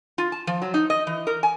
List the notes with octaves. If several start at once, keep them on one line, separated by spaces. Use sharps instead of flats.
F4
A5
F3
F#3
D#4
D#5
E3
A#4
G#5